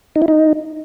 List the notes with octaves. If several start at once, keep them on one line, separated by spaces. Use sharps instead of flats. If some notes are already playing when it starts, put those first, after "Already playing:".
D#4
E4
D#4